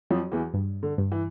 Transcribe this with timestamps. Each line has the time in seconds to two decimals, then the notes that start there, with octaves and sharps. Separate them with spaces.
0.10 F2 F3 F#3
0.32 E2 E3
0.54 G2
0.83 D3
0.98 G2
1.12 E3